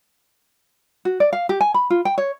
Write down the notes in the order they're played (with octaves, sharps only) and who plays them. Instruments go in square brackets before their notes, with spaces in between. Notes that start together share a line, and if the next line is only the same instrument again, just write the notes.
[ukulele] F#4
D5
F5
G4
G#5
B5
F4
G5
C#5